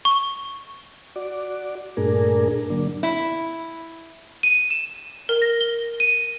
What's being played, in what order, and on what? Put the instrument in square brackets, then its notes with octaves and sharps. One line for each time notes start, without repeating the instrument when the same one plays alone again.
[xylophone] C#6
[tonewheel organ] F#4 D5
G2 A#2 A3 D4 G#4 A#4
D3 F#3 A#3 D4
[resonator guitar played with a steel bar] E4
[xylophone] D#7
E7
A#4
A#6
G7
D#7